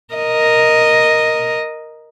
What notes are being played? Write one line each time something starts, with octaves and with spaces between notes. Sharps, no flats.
A#4 D#5